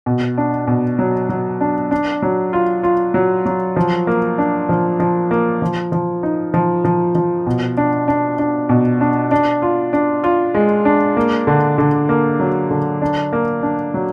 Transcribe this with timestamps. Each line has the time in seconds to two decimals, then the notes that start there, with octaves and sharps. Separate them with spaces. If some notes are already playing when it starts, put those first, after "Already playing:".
0.06 B2
0.38 D4
0.67 B2
0.99 F#3
1.29 F#3
1.61 D4
1.91 D4
2.22 F#3
2.53 F4
2.83 F4
3.14 F#3
3.46 F#3
3.76 F3
4.07 A#3
4.38 D4
4.69 F3
5.00 F3
5.31 A#3
5.62 F3
5.92 F3
6.23 D#4
6.54 F3
6.85 F3
7.15 F3
7.47 B2
7.77 D4
8.08 D4
8.39 D4
8.69 B2
9.01 D4
9.31 D4
9.62 F4
9.93 D4
10.24 F4
10.54 G#3
10.85 D4
11.17 A#3
11.47 D3
11.78 D3
12.09 A#3
12.40 F#3
12.71 D3
13.02 D4
13.33 A#3
13.63 D4
13.94 F#3